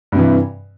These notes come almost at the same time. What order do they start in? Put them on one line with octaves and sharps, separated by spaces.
G2 C3 E3